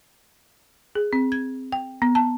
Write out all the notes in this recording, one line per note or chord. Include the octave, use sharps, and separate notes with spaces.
G#4
C4
G#6
G5
B3
A5